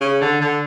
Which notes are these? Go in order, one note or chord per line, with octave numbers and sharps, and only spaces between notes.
C#3
D3
D3